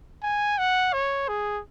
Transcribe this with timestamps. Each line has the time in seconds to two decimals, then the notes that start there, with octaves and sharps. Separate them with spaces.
0.23 G#5
0.58 F#5
0.93 C#5
1.28 G#4